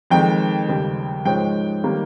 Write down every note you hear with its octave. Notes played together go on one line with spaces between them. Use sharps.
F2 D#3 G#3 G5
D#2 C#3 G3
G#2 F3 G#3 C#4 G5
D#3 G3 A#3